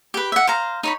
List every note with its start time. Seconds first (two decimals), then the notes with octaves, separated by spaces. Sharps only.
0.14 G4 B4
0.32 E5 F#5
0.47 C5 F5 A#5
0.83 D#4 C#5 B5